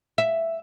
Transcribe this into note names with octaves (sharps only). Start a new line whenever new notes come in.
E5